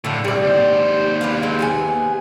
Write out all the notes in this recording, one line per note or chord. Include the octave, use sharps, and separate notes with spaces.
A2 D3 F3 F#4
C2 G3 D5
D#2 C5
B3 D4 F5
F#3 G#3
G3 B3 G#5